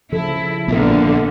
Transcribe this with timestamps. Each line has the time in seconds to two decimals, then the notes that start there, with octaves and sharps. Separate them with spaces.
0.12 C#3 F3 E4 A4
0.68 A#1 A#2 D3 B3 F4 A#4